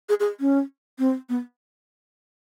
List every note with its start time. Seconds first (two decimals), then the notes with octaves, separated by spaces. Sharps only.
0.09 G#4
0.20 G#4
0.40 C#4
0.99 C4
1.29 B3